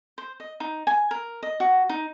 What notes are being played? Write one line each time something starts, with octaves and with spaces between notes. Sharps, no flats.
C5
D#5
D#4
G#5
A#4
D#5
F#4
D#4